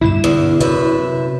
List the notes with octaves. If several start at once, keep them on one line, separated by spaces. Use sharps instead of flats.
G2 B2 D3 E4 E7
E2 D3
F#2 C3 B4 E5